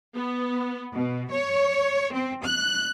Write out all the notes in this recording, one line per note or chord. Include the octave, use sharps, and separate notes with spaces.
B3
B2
C#5
C4
F#6